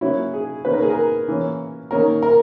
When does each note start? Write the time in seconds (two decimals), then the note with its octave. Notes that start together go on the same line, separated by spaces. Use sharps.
0.01 C#3 F#3 A#3 C#4 E4
0.34 G#4
0.65 D#3 A#3 C#4 B4
0.74 A#4
0.82 G#4
0.90 A#4
1.28 E3 A#3 C#4
1.91 D#3 A#3 C#4 A#4
2.22 A#4